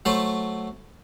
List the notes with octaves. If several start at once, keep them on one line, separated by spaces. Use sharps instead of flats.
F#3 A3 C5 A5 B5